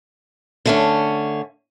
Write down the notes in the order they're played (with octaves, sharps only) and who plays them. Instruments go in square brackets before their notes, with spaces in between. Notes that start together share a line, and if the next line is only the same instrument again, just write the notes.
[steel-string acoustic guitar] D3 A3 C#4